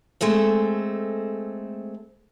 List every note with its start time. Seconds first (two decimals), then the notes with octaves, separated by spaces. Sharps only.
0.21 G#3 A3 C4 A4